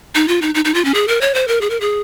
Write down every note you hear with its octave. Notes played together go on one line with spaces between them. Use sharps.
D#4
F4
D#4
D#4
D#4
F4
C#4
G#4
A#4
C#5
C5
A#4
G#4
A#4
G#4